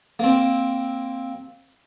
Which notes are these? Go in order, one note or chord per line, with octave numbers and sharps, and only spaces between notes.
A#3 C4